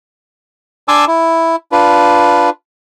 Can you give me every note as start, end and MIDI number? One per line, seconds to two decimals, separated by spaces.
0.88 1.05 62
0.88 1.05 80
0.88 1.05 81
0.88 1.05 84
0.88 1.05 86
0.88 1.05 88
1.07 1.56 64
1.72 2.50 62
1.72 2.50 65
1.72 2.50 71